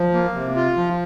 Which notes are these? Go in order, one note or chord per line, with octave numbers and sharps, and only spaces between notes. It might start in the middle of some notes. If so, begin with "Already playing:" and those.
Already playing: F3
A#3
C3
F4
F3